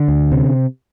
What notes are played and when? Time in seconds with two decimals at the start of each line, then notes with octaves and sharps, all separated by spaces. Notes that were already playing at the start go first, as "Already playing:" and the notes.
Already playing: D3
0.08 D2
0.31 C3